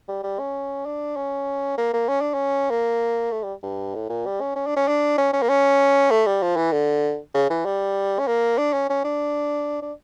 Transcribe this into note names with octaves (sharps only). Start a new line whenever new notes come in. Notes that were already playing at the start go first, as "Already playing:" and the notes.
G3
G3
C#4
D4
C#4
A#3
A#3
C#4
D4
C#4
A#3
A3
G3
G2
A2
A#2
G3
C#4
C#4
D4
C#4
D4
C#4
C#4
A#3
C#4
A3
G3
F3
E3
D3
C#3
E3
G3
C#4
A#3
D4
C#4
C#4
D4
D4